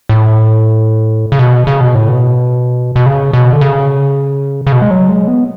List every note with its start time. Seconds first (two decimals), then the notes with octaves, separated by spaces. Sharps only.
0.09 A2
1.32 C#3
1.39 B2
1.67 C#3
1.81 B2
1.95 A2
2.09 B2
2.96 B2
3.06 C#3
3.33 B2
3.53 D3
3.61 C#3
4.67 C#3
4.72 B2
4.82 G#3
4.91 F#3
5.09 G#3
5.28 B3